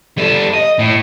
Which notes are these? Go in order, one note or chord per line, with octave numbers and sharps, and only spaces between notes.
G3 A4
D#5
A2